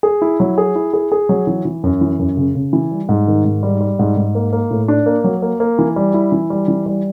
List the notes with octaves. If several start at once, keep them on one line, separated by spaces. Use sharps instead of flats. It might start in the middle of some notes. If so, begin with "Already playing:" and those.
G#4
E4
F#3
G#4
E4
G#4
G#4
F#3
E3
E3
F#2
E3
F#2
C#3
C#3
E3
G3
G#2
D#3
G#2
G3
G3
G#2
G#2
A#3
A#3
A2
D4
A#3
F#3
A#3
A#3
E3
G3
E4
E3
G3
E3
G3